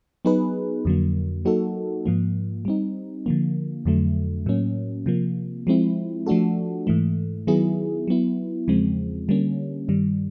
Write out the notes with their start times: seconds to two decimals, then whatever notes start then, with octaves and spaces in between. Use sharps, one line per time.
0.25 F#3 B3 D#4 G#4 B4
0.85 F2 D3 F#3 A#3
1.45 F#3 A#3 D#4 F#4 A4
2.06 G#2 F3 A#3
2.65 G3 C4 D#4
3.26 D3 F3 A#3
3.85 F2 D3 F#3 A3
4.46 A2 F#3 A#3 C#4
5.06 C3 F3 A#3
5.67 F3 G#3 C4 E4
6.26 F3 A3 D4 F#4 A4
6.87 G#2 E3 A3
7.47 D#3 F#3 B3 E4 G#4
8.08 F#3 B3 E4
8.68 E2 C#3 F3 G#3 C4
9.29 D3 G3 A#3 C#4
9.88 G2 D#3 G3